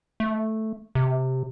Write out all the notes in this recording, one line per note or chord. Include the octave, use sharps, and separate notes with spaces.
A3
C3